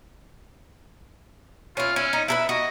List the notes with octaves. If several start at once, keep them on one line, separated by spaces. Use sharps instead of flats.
C#4 E4 F4
C#4 E4
D#4
E4 A4 B4 E5
F#4 D#5